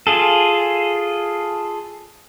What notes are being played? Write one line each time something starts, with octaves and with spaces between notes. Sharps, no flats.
F4 G#4 A4